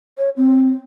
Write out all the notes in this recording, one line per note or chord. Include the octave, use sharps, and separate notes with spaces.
C#5
C4